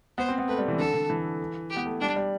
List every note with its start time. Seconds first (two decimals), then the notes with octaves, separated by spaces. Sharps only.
0.18 B3 C5
0.29 C4
0.38 B3
0.48 A3 B4
0.59 G3
0.68 E3
0.78 D3 A4
0.94 D3
1.10 E3
1.70 G4
1.76 B3
1.86 A3
2.01 G3 D4
2.16 G3